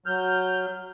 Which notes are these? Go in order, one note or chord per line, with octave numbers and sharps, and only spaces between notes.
F#3 F6 G6